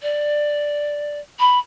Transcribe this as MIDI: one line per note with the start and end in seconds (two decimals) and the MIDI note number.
0.02 1.19 74
1.39 1.58 83